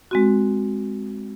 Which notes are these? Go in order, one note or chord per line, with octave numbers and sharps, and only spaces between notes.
G#3 C4 F#4